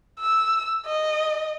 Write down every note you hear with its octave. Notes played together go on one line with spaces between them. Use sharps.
E6
D#5